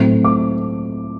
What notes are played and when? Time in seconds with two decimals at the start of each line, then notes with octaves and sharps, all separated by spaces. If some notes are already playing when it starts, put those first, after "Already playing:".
Already playing: A2 F#3 A3 C4
0.25 D6